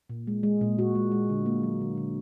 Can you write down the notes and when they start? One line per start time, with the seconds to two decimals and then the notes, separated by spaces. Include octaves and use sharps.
0.10 A#2
0.27 G#3
0.43 G#3
0.61 A#2
0.79 A#2 F#4
0.95 G#3
1.12 G#3
1.30 D3
1.46 A#3
1.63 F#3
1.81 D3
1.97 D3